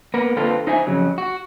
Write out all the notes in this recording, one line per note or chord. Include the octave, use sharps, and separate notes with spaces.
A#3 B3 A#4
D3 A#3 C4 F4 A4 B4
D#4 C5 E5 G#5
F2 C#3 F#3
F#4